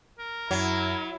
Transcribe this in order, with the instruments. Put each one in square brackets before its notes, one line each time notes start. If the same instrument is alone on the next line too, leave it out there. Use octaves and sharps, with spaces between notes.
[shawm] A#4
[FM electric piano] F#2 G#6 [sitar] F#3 [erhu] E4